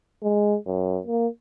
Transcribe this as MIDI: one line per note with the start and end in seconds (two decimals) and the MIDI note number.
0.23 0.57 56
0.67 1.00 42
1.07 1.27 58